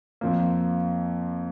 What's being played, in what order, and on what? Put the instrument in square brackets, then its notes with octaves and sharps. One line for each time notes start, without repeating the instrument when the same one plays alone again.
[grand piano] F2 F3 A#3